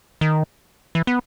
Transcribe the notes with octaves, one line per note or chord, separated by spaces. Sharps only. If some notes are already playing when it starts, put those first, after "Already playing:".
D#3
E3
B3